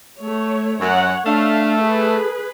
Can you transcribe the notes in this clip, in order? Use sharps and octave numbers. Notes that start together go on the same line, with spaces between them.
A3 C#5
F#2 C#5 F#5
A3 D4 F5
G#4 A4 B4